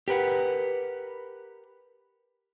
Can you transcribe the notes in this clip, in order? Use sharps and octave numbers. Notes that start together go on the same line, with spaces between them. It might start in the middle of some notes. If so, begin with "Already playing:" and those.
G4 A#4 B4 F#5